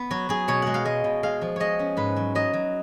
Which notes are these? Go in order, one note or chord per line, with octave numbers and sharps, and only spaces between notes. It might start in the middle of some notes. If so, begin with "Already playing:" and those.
Already playing: B3
F#3 F#4
F#3 G#4
B2 C#5
G#3 F#5
F5
G#3 D#5
B2
G#3 F5
F3
G#3 C#5 D#5
C#4
G#2 B4
F#3
F#3 D#5
F#3